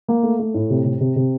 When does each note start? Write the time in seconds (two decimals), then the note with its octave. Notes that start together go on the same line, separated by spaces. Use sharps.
0.08 A#3
0.23 A3
0.39 A3
0.54 A2
0.70 C3
0.85 C3
1.01 C3
1.16 C3